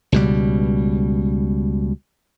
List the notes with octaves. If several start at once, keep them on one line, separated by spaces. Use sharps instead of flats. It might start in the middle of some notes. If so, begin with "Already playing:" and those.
C#2 B2 G3